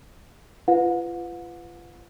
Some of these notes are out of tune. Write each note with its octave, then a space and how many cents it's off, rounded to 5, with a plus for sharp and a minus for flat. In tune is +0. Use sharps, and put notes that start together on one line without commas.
F4 -30 B4 +20 F#5 -45